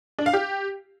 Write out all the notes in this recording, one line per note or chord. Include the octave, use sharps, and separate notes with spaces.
D4
F5
G4